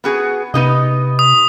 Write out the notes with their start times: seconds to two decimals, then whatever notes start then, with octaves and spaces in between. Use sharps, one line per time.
0.04 B3 F#4 G#4
0.54 C3 B3 D#4 D#5
1.19 D#6